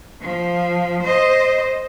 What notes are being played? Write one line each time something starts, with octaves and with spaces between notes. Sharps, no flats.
F3
C5 D#5